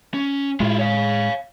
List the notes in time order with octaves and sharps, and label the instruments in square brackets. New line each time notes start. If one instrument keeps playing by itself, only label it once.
[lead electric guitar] C#4
[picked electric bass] A2 G#3 [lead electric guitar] E4 F4
[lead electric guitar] C#5 F5